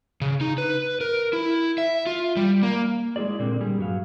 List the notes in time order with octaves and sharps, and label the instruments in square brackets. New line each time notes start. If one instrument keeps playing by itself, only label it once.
[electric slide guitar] C#3
D#4
B4
A#4
E4
E5
F4
G3
A#3
G#3 E4 F#4 G#4 D5
A#2 D3 A#3 C4
G3 G#4
G2 F#3 F5